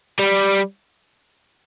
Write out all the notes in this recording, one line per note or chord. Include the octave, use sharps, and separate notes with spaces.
G3